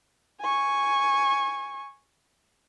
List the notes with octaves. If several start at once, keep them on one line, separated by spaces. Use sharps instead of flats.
G#5 C#6